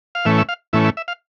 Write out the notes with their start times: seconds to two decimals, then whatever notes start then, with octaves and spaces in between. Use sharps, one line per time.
0.15 F5
0.25 A2 E3 A3 C#4 E5
0.38 E5
0.49 F5
0.73 A2 E3 A3 C#4 E5
0.85 E5
0.97 E5
1.08 F5